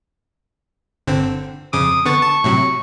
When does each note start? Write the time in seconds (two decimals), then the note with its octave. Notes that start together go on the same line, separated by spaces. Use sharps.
1.07 G1 D3 C4
1.73 F2 C#3 D6 D#6
2.05 D3 B3 C#6 A6
2.22 A5
2.44 A2 C3 F#3